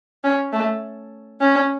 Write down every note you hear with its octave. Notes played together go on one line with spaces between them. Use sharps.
C#4
A3
C#4